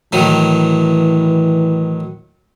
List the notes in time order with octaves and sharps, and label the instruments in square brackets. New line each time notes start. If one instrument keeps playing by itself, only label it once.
[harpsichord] A2 D#3 F#3 [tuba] E3